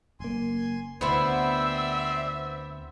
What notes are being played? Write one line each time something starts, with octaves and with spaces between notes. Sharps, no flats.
F#1 A#3 G#5 C6
D2 B3 C4 E4 C5 D5 E5